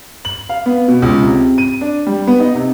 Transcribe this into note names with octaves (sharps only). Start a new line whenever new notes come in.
F#7
F5
B3
B2
C#2
C3
D#7
D4
G3
B3
D#4
C3